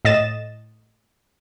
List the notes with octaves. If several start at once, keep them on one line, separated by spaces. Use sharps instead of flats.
A2 D#5 A6 E7